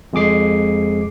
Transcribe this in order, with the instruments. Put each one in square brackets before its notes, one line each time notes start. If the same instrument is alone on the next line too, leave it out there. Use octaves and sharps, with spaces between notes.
[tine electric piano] F2 G#3 G#4 D6 C7